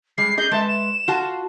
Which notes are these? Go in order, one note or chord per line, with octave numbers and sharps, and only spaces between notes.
G3 G#3 C7
G#4 D#5 G6
G#3 B4 E5 A5
E7
F4 F#4 A5